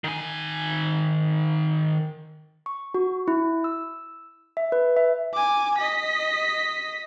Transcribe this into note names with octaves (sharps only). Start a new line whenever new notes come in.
D#3 G#5
C#6
F#4
E4
E6
E5
B4
E5
G#5 D6
D#5 B6